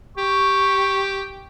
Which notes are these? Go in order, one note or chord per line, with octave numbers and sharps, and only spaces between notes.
G4 C#6